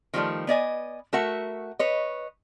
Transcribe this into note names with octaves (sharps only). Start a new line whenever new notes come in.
D#3 F3 G3 A3
B3 D5 D#5 G#5
A3 F#4 A#4 E5 F#5
B4 C#5 D#5